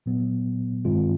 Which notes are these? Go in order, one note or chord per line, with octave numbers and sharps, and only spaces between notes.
A#2 F#3 B3
G2 D#3 G#3 C4 F4